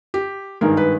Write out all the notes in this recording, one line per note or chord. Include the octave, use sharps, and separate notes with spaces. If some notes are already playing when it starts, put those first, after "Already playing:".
G4
G#1 G2 D#3 G#3 A#4
B4